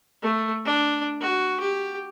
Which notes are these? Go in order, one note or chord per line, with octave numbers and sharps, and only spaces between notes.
A3
D4
F#4
G4